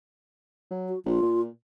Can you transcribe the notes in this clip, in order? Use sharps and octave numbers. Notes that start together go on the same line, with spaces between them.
F#3
F#4
A#1 F4
A#2